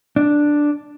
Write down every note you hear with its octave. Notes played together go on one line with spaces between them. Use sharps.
D4